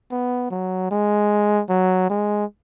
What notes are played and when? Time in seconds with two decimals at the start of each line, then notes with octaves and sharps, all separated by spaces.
0.12 B3
0.51 F#3
0.91 G#3
1.69 F#3
2.10 G#3